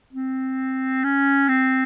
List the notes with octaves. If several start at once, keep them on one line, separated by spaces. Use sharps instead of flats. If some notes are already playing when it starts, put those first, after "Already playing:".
C4
C#4
C4